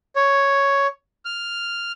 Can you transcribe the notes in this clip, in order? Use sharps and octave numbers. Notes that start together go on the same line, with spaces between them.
C#5
F6